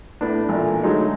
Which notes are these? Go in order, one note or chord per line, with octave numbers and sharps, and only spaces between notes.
A2 B3 D4
A1 A#2
D3 F#3 G#3 A3 D#4